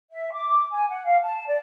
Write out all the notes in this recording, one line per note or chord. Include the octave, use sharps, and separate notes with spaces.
E5
D6
G#5
F#5
F5
A5
D5